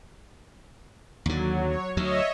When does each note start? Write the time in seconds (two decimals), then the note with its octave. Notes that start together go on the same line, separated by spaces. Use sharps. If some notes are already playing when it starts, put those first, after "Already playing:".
1.26 D#2 D3 F#3
1.64 C#5
1.97 D2 F#3 C#5 D#5 E5